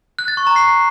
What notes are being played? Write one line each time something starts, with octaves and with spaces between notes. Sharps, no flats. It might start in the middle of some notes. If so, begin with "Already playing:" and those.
F#6
A6
C#6
A#5
C7